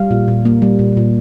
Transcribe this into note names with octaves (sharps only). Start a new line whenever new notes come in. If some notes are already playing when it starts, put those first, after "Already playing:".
Already playing: G3 F5
A#2
A#2
A#3
G3
A#2
A#2